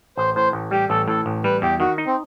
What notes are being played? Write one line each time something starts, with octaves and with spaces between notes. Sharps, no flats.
A1 C5
A2 C5
A1
G3 G4
A1 A4
A2 A4
A1
G3 B4
E2 G4
D#3 F#4
D#4
C4